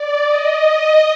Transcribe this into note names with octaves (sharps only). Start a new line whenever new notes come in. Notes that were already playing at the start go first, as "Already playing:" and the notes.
Already playing: D5
D#5